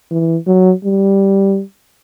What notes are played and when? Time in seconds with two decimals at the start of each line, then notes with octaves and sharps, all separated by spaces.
0.11 E3
0.47 F#3
0.84 G3